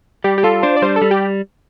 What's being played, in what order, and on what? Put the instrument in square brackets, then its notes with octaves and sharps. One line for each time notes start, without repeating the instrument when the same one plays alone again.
[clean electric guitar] G3 [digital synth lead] G4
[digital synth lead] G4
[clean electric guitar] F4 [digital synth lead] A4
[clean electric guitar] D4 [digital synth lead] C5
[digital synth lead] D5
[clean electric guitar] G3 [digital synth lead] C5
[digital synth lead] A4
[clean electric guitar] G3
[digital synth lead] G4